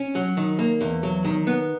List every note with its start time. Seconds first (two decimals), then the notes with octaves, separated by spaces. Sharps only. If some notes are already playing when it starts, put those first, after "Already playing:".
Already playing: C#4
0.15 F#3
0.37 D#3
0.59 A#3
0.81 E2
1.03 F#3
1.25 D#3
1.47 B3